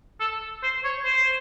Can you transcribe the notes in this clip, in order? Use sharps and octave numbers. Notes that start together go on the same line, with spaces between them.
A4
C5
C#5
C5